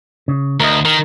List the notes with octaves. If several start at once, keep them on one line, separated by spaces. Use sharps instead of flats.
C#3
D2 A#4 D#5
D#3 A#4